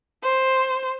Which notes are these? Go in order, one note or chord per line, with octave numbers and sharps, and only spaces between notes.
C5